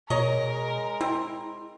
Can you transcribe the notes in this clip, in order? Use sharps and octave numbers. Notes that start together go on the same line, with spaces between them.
B2 G#3 A#4 C#5 D#5
C4 E4